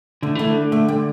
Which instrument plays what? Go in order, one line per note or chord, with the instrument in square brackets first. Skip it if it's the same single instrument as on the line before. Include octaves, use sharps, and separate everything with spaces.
[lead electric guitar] D3 [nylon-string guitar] A3
[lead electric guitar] E3 [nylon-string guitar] A3
[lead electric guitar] D3
[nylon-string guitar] A3
G3